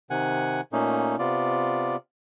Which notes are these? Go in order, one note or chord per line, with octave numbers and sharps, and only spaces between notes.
C3 D#3 F#5 G#5
A#2 A3 A#3 C#4 D#4
C3 B3 F4 D5